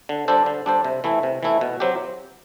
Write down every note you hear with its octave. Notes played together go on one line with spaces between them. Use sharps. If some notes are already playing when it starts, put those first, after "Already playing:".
D3
G3 D4 A4 C5
D3
G3 D4 A4 C5
C3
E3 A3 E4
C3
E3 A3 E4
B2
F#3 C4 G4